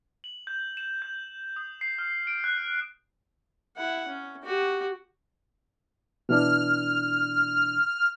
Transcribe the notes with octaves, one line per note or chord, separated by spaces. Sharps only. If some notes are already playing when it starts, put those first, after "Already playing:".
F#7
G6
E7
G6
D#6
C7
F6
D7
F#6
E4 F#5
C#4
F#4 G4
B2 E3 D4 F6